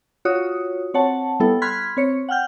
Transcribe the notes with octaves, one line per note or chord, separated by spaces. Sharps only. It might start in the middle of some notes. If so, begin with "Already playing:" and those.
F4 F#4 C#5 D#6
C4 C#5 F#5 A5
G3 B3 E4 A4
B5 C6 F6 F#6 G#6 B6
C4 C#5 C#7
F#5 G5 F6 G6